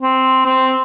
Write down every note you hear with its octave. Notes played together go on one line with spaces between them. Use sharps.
C4
C4